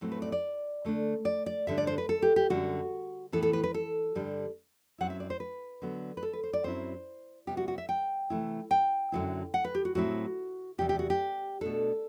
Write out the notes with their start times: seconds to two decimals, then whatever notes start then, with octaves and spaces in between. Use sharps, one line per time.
0.01 A2 F#3 A3 C4 E4
0.12 B4
0.22 D5
0.32 D5
0.85 D3 A3 D4
1.25 D5
1.46 D5
1.67 G2 D3 G3 D4 E5
1.78 D5
1.87 C5
1.98 B4
2.09 A4
2.22 G4
2.36 G4
2.50 F#2 D3 G3 D4 F#4
3.32 A2 E3 B3 E4 A4
3.43 A4
3.53 B4
3.64 B4
3.74 A4
4.15 G2 D3 G3 D4
4.98 F#2 F#3 C4 E4 F#5
5.10 E5
5.20 D5
5.30 C5
5.40 B4
5.82 D3 F#3 B3
6.17 B4
6.23 A4
6.33 B4
6.43 C5
6.53 D5
6.64 F#2 F#3 C4 E4 C5
7.47 C3 G3 B3 G4
7.57 F#4
7.68 F#4
7.78 E5
7.89 G5
8.30 C3 E3 A3 E4
8.71 G5
9.12 F#2 D3 F#3 C4 E4
9.54 F#5
9.64 B4
9.75 G4
9.85 F#4
9.95 A2 F#3 C4 E4 F#4
10.78 E2 C3 G3 G4
10.89 G4
10.99 F#4
11.10 G4
11.61 B2 A3 D4 A4